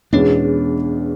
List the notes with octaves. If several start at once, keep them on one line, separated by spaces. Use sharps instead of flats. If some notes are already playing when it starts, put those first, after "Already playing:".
E2 B2 G#3 B3 C#4 D4